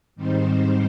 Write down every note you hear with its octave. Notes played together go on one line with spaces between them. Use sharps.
G#2 D#3 G3 C4 D#4 C5